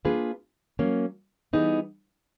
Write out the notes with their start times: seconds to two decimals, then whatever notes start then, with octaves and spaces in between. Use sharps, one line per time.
0.05 A#3 D4 F4 G#4 B4
0.79 F#3 A#3 C#4
1.53 E3 G3 B3 D#4 G#4